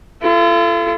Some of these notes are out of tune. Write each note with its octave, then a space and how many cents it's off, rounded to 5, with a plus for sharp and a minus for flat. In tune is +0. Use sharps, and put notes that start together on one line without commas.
F4 -40 A4 +0